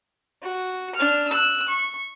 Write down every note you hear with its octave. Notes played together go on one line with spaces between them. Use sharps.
F#4
D4 F6
E6 F#6
C#6